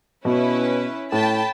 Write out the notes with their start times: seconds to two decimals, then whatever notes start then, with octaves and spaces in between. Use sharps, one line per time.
0.25 B2 C#4 E4 B4
1.12 A2 G5 A5 B5